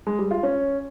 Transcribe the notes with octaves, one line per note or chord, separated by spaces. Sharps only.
G#3
G3
F4
C#4